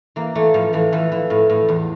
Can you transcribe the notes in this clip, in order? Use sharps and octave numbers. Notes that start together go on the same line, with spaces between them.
E3 A#3
E3 A3
A2 F3
A2 E3
E3 F3
E3
A2
A2
E2